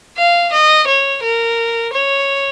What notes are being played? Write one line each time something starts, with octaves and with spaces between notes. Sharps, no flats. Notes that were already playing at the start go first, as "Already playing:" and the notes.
F5
D#5
C#5
A#4
C#5